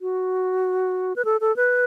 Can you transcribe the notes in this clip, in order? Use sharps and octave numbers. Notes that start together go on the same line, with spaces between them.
F#4
B4
A4
A4
B4